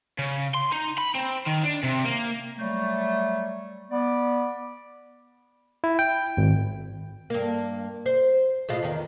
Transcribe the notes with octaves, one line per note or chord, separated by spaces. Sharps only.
C#3
C6
D#4
B5
C4
D#3
D4
C3
A#3
F#3 G3 A3
B3 D5
E4
G5
G#1
G2 A#3
C5
A2 G#3 F4
E2 D#3